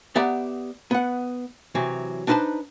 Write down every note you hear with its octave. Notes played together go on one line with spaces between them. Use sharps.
B3 G4 D5 E5 F#5 A#5
B3 F#5
C3 E3 F#3
D4 D#4 A4 B4 C5 A5